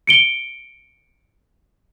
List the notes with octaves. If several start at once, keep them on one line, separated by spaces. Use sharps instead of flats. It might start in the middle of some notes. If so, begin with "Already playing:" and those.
C#7 D7 G7